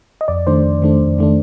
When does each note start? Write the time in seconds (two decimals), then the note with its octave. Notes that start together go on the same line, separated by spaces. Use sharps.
0.21 D#5
0.28 F2 D5
0.47 D#3 A3 D4 C5
0.65 F2
0.82 D#3 A3 D4
1.01 F2
1.19 D#3 A3 D4